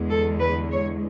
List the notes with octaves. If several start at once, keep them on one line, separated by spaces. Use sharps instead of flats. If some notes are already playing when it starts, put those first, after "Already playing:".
Already playing: E2 D3 G#3
A4
B4
C#5